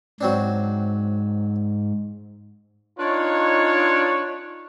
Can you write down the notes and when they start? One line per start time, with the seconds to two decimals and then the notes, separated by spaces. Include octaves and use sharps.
0.21 G#2 F#3 C4 D4
2.99 D4 D#4 F4 B4 C#5